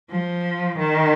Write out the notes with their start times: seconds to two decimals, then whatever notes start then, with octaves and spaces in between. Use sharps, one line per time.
0.11 F3
0.78 D#3